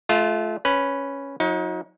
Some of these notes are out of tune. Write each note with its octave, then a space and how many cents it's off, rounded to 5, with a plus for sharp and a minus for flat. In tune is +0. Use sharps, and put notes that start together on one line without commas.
A3 -30 F4 +0
C#4 +0 B4 +0
F#3 -35 D#4 +30